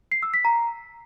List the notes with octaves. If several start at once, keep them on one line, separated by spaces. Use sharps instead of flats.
C7
E6
B6
A#5